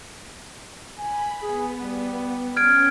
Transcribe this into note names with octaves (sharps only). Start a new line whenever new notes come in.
G#5 B5
B3 G#4
G3
C#4 G5 F6 G#6 D7